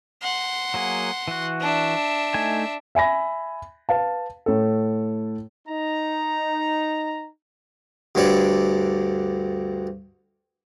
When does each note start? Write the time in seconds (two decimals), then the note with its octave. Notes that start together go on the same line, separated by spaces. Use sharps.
0.22 F#5 C6
0.74 F#3 A#3 G#4
1.28 E3 F#4
1.60 D4 E5
2.34 A3 D#4 G#5
2.95 E5 G#5 B5 A#6
3.89 B4 F5 A5
4.46 A2 A4
5.68 D#4 A#5
8.15 D2 G2 D3 C#5 D5